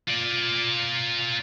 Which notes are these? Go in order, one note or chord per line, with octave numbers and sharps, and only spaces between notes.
F4 D5